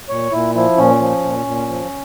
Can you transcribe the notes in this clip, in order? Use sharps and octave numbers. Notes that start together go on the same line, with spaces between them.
A#2 C#5
A#2 E4
F3 E4
A#2 C#4
F3
A#2
A#2
F3